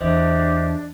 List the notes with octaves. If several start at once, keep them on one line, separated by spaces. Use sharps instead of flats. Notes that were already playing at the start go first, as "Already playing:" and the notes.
E2 D4 G4 C5 D#5 E5